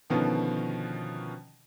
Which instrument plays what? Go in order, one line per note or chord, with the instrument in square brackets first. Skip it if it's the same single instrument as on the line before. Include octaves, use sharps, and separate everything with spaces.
[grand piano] B2 D3 D#3 F3 B3 C#4